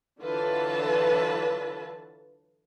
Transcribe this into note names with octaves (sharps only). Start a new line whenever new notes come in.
D3 E3 F#3 F4 B4 A5